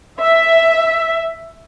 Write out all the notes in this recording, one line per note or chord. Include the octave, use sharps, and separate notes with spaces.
E5